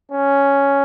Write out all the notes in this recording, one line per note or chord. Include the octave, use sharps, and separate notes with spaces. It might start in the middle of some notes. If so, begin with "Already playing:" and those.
C#4